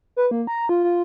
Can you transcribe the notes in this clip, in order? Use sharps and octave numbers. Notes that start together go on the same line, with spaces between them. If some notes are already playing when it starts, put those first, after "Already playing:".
B4
A#3
A#5
F4
F4